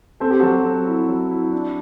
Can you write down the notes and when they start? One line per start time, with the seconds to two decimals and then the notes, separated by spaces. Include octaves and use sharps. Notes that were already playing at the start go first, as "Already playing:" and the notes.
0.20 C4 A4
0.30 G4
0.40 F#3 F#4 A4
0.64 C4
0.87 E4
1.09 F#3
1.31 E4
1.52 D4